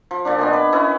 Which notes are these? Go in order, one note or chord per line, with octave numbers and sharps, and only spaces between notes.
F3
A#2 F3 D4
B3 D4 D#5 G#5
B4
B3 C#4 E4